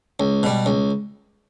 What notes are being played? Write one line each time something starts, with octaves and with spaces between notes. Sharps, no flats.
C#2
B2 G3
C#2